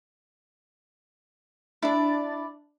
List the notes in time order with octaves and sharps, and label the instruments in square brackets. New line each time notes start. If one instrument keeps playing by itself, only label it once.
[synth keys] D4 A6 [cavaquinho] E4 D5